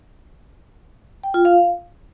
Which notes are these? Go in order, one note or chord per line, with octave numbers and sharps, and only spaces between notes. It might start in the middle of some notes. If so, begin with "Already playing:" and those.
G5
F4
F5